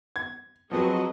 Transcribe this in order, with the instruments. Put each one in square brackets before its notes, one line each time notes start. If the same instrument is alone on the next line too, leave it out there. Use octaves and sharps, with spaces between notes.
[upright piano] G#6
[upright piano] F3 C4 B4 [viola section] F#3 G#4 D#5